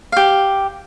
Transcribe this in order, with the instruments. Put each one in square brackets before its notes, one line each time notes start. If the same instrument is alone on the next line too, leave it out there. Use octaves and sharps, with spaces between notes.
[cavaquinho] G4 F5